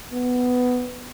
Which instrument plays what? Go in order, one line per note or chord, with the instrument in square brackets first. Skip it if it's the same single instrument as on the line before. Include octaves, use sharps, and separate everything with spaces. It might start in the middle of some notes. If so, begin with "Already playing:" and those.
[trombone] B3